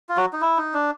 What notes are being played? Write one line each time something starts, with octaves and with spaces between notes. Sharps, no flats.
F4
F#3 F#4
D#4
E4
D#4
D4